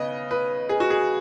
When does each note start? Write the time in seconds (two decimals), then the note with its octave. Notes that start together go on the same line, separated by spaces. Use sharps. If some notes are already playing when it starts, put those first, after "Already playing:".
Already playing: C#3 B3 B4 D#5
0.31 B4
0.69 G#4
0.80 F#4
0.90 G#4